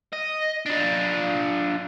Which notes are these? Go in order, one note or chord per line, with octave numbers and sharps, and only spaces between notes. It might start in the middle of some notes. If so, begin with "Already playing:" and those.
D#5
D4 F4